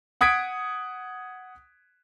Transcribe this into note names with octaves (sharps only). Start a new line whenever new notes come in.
F#5 D#6 G#6 B6 D7